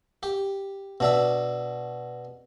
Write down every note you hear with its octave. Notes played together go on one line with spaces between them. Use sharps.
G4
B2 D4 E5